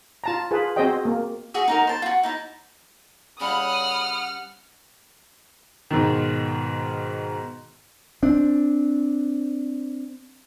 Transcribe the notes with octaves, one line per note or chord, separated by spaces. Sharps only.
F4 A5 A#5
F4 G#4 B4
C4 F#4 G#4 C5 D#5 G5
A#3
F#4 G#4 E5
D#4 F#4 A#4
C5 A5
F4 F#4
D#4 E4 A5
C#3 G3 F#5 B5 D#6 F6
G#2 B2 D#3
C4 D4